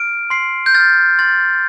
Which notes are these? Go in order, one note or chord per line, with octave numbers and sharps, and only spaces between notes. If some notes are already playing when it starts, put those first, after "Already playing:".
Already playing: F6 D7
C6 C7
G6
F6 A6
C6 A6